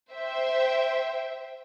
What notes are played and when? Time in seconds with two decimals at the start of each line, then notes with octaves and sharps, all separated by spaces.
0.12 C5 E5 G5